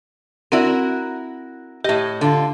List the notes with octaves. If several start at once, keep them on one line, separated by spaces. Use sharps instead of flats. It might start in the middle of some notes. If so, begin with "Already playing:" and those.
C4 E4 F#4 A#4 D5
A2 G4 D#5
D3 F4